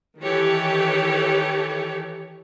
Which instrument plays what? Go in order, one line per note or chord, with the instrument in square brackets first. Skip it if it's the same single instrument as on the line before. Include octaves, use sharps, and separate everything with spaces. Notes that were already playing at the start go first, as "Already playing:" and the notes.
[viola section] D#3 E3 G4 A4 C#5